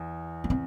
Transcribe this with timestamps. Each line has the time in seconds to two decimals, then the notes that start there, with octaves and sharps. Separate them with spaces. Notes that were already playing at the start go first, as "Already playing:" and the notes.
Already playing: E2
0.44 B3
0.50 C4